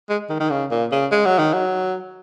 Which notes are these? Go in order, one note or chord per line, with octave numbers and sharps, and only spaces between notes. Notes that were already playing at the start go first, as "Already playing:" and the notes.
G#3
D#3
D#3
C#3
A#2
C#3
G#3
F#3
D#3
F#3